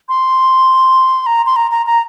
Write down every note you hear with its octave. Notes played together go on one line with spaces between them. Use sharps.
C6
A#5
C6
A#5
A#5
A#5